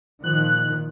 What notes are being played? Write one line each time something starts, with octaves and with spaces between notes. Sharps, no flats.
A#2 D#3 F3 F#6